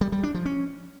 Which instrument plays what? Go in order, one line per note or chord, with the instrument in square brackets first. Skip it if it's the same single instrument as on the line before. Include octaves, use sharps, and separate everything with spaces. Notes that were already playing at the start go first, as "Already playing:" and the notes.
[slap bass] G3
G3
D4
F3
C#4